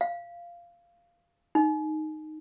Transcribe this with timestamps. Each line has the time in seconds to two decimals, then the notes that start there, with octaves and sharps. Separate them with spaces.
0.01 F5
1.55 D#4